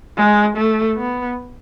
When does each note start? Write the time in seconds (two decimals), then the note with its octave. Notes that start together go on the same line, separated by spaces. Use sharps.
0.17 G#3
0.57 A3
0.97 B3